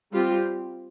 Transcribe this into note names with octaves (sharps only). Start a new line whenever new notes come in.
G3 C4 F4 G4